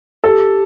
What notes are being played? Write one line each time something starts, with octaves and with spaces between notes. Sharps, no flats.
G4 A4